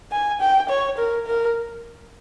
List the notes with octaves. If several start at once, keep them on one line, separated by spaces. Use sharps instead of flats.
G#5
G5
C#5
A#4
A#4